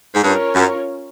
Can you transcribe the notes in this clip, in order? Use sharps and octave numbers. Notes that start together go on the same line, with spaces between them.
G#2
G2 C#4 F4 A#4 C#5
F#2